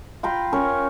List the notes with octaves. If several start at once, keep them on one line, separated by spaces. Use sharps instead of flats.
F4 G5 A#5 B5
C#4 A#4 C#5